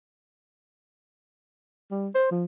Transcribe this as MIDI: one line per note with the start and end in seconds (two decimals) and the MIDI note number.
1.91 2.08 55
2.15 2.31 72
2.31 2.45 53